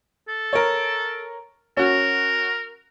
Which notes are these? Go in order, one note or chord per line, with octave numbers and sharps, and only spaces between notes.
A4
A#4 C#5
C#4 F#4 A#4